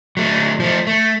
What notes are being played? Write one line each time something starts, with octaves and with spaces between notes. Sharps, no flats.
F#3 A3
F3 A3
A3